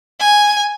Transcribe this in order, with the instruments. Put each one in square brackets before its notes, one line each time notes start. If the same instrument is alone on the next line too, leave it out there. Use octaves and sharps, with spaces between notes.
[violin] G#5